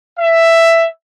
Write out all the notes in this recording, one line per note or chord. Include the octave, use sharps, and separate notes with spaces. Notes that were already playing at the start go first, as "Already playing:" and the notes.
E5